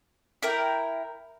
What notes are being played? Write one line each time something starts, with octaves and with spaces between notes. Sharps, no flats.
E4 A#4 G5